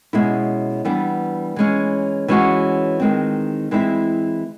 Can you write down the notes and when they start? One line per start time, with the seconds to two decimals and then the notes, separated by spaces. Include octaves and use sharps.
0.13 B2 G#3 C#4 E4
0.85 E3 G3 B3 D4
1.56 E3 G#3 C#4
2.28 E3 G#3 C#4 F#4
3.00 D#3 G#3 C4
3.71 E3 G#3 C4 E4